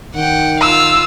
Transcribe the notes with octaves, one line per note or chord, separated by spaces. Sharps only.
D#3 F#5 G5
F4 F5 E6